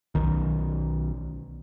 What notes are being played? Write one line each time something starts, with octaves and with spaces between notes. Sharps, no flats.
B1 D#3